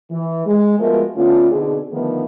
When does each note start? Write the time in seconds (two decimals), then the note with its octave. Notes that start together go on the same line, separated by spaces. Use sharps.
0.11 E3
0.46 G#3
0.79 F3 G#3 A3 B3 F#4 A#4
1.16 D3 A3 B3 C#4 F4
1.51 B2 D3 C4 D#4 G#4
1.92 D3 D#3 F3 A3 B3